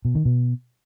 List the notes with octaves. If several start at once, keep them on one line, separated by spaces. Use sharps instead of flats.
B2
D#3
B2